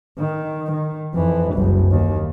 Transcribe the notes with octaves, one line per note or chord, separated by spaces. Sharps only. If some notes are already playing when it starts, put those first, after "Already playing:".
D#3
D#3
F2 E3
F#1 C2
D#2